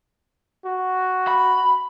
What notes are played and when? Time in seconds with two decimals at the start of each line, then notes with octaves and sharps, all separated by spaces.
0.66 F#4
1.28 B5